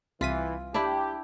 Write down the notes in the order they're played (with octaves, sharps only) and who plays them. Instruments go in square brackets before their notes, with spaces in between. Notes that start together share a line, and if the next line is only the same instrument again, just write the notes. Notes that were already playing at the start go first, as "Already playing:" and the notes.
[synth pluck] C2 B6 D#7 [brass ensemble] E3 [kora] F4
[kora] D4 E4 [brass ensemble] G4